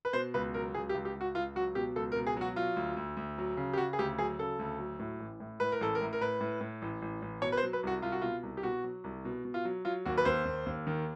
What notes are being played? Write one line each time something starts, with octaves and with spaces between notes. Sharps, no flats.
B4
B2 C5
C#2 B4
F#3 A#4
C#2 G#4
G4
C#2
G4
C#2
F#4
C#2 F4
F#3 F#4
B2 G4
C#2 A4
A#4
B2
G#4
F#3 F#4
F#3 F4
D2
D2
D2
F#3
C#3
G4
C#3 F#4
G#4
D2 G4
F#3 G#4
C#3 A4
D2
F#3
A2
A1
A2
A2 B4
A#4
A1 A4
A#4
A2
A#4
A2 B4
A2
A2
A1
A1
A1
B2 C#5
B4
C5
F#3
B4
C2 F#4
C2 F4
F#4
B2 F4
C2
G4
B2 F#4
F#3
C2
B2
B2
F4
F#3
F#3 F4
D#2 F#4
B4
D#2 C5
D#2
D#2
D#3